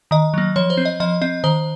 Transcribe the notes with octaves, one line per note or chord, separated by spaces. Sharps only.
D#3 D#5
F#3 A#3
F3 C#5
C5
C4
D#5
F3 D#5
C4 D#5
D#3 C5